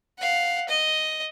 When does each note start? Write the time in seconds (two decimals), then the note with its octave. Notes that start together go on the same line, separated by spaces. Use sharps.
0.19 F5 F#5
0.69 D#5